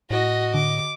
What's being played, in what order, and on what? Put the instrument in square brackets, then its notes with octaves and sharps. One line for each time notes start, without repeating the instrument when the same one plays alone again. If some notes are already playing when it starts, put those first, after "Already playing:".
[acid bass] A2 [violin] F#4 A#6 [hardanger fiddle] D#5
[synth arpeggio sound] D3 [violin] D6